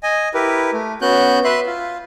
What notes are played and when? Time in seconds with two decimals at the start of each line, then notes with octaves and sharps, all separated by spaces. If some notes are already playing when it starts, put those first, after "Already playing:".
0.03 D#5 G#5
0.34 E4 G4 A#4 B4
0.73 A3
1.01 B3 C#4 F#4 F#6 G6
1.44 B4 E5 C6 F#6
1.66 F4